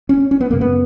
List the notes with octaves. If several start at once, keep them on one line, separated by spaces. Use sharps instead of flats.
C#4
C#4
B3
F#2 C#3 A#3
B3